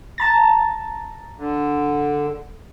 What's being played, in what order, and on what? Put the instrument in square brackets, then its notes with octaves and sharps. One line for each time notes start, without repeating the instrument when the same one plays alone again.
[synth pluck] A5 A#5 A6
[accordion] D3